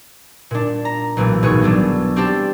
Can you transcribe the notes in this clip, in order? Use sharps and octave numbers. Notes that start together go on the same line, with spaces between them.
A#2 D4
A#5
B1 A#2 E3 A3
G#1 B2 B3 G#4 C#6
F#3 A3 D4
C4 D4 F4 G4 A4